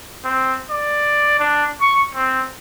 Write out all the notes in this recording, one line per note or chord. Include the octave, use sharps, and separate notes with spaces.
C4
D5
D4
C#6
C4